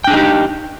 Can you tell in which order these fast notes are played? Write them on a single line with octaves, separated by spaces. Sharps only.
G5 D4 G#4 D#4 G4